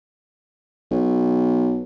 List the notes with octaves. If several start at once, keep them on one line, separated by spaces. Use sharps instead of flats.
B1